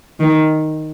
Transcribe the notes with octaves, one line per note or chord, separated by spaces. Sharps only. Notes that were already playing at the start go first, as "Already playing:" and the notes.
D#3